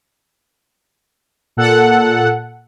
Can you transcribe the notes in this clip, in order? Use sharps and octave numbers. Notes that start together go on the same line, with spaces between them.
A#2 A4 F#5